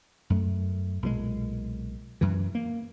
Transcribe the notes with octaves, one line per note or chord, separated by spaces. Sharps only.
F#2 A3
B1 A#2 D#3 G#3
F#2 E3
A#3